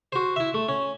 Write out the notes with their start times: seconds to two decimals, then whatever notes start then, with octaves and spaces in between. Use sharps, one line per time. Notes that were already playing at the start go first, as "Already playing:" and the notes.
0.12 F#4 C5
0.36 E4 E5
0.54 A3
0.69 C#4